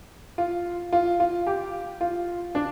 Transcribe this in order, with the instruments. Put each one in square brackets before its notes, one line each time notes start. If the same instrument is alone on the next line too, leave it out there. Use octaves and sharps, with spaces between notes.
[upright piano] F4
F4
F4
G4
F4
D4